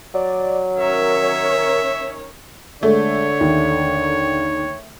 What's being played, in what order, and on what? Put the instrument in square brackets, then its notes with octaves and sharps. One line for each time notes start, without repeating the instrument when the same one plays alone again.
[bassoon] F#3 [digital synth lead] D5
[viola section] D#3 C#4 C#5 [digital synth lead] A#4 [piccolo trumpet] E5
[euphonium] D3 [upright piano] G#3 [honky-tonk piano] A3 [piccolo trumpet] C#5
[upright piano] D#2